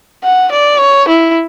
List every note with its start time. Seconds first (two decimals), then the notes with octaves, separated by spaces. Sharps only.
0.23 F#5
0.51 D5
0.80 C#5
1.08 E4